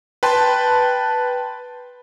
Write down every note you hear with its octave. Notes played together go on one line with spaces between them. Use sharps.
B4 G5 A5 C6